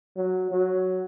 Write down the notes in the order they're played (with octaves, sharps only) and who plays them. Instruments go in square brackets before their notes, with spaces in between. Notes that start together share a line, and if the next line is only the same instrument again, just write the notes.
[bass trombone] F#3
F#3